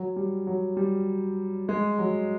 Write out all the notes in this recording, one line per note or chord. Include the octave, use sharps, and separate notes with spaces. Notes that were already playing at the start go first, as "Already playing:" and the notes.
Already playing: F#3
G3
F#3
G3
G#3
F#3